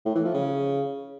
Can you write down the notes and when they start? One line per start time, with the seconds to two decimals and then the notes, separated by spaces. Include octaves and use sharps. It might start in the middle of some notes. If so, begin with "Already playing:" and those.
0.06 A2
0.15 E3
0.25 F3
0.34 C#3